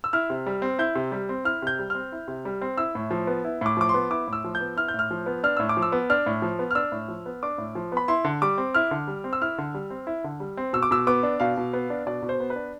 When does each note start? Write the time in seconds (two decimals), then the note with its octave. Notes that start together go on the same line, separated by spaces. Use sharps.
0.04 E6
0.13 E4 F6
0.30 C3
0.46 G3
0.62 C4
0.79 E4 G6
0.95 C3
1.12 G3
1.29 C4
1.45 E4 F6
1.62 C3 G6
1.79 G3
1.90 C4 F6
2.12 E4
2.28 C3
2.45 G3
2.61 C4
2.77 E4 E6
2.95 A2
3.11 F3
3.27 B3
3.45 E4
3.61 A2 D6
3.77 F3 D6
3.89 C6
3.94 B3
4.11 E4 D6
4.28 A2 E6
4.44 F3
4.55 G6
4.60 B3
4.77 E4 F6
4.88 G6
4.94 A2 F6
5.11 F3
5.26 B3
5.43 D4 F6
5.57 A2 E6
5.69 D6
5.77 F3
5.82 E6
5.92 B3
6.10 D4 F6
6.26 A2
6.42 F3
6.59 B3
6.71 F6
6.75 D4 E6
6.92 A2
7.08 F3
7.26 B3
7.43 D4 D6
7.58 A2
7.75 F3
7.92 B3 B5
8.08 E4 C6
8.24 D3
8.42 G3 D6
8.58 C4
8.75 E4 F6
8.91 D3
9.07 G3
9.24 C4
9.33 E6
9.42 E4 F6
9.58 D3
9.74 G3
9.90 C4
10.07 E4
10.24 D3
10.40 G3
10.57 C4
10.73 B2 E6
10.83 D6
10.91 B2 E6
11.07 B3 D6
11.23 D4
11.40 B2 F5
11.57 B2
11.73 B3
11.90 D4
12.07 B2 D5
12.22 B2
12.29 C5
12.40 B3
12.50 B4
12.56 D4